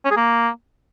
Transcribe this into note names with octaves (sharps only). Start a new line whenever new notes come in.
C#4
G#4
A#3